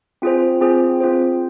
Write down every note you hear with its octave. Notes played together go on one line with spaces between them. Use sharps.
C4 F4 G#4 C5
C4 F4 G#4 C5
C4 F4 G#4 C5